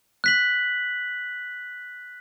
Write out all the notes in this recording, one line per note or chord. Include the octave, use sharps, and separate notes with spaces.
F#6 B6 F#7